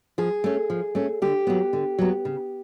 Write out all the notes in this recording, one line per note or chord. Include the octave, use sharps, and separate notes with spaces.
F3 G#4
A3 C#4
F3
A3 C#4
D3 G4
F#3 B3
D3
F#3 B3
C#3